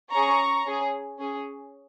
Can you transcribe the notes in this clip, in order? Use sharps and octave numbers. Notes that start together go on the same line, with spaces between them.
C#4 G#4 A#5 C#6
C#4 G#4
C#4 G#4